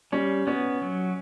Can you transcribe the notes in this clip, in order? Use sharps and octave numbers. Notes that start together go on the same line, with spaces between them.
G3 C#4
B3 C#4
F#3